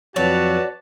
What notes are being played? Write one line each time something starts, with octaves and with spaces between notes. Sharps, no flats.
F2 F#3 F#4 B4 C#5 D5 A5